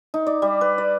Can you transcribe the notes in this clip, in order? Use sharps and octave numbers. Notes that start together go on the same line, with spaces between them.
D#4
D5
G3
B4
D5